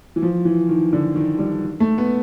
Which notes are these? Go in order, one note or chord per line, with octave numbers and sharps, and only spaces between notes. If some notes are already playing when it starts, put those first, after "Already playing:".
E3
F3
E3
D#3
D3
D#3
G3
A3
B3